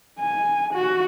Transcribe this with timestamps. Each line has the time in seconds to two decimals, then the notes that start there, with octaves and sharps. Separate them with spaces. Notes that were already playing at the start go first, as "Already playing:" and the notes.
0.19 G#5
0.74 F#4